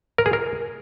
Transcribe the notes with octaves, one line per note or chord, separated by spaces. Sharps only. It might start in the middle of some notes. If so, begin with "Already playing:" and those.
A#4
G#4
A#4